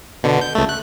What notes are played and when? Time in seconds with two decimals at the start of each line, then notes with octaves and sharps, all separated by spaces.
0.23 B2 D3
0.41 G6
0.55 C#2 A3
0.69 F#6